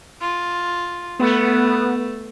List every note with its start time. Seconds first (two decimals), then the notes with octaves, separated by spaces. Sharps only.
0.22 F4
1.19 A3 B3